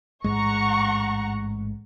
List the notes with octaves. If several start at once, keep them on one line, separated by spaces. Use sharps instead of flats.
A1 G#2 G#3 F#5 A#5 C#6